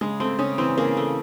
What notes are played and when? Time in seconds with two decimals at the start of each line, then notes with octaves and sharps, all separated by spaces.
0.01 C#3 G#3
0.20 A3 C4
0.39 C#3 C#4
0.58 E3 C4
0.77 C#3 A#3
0.97 A3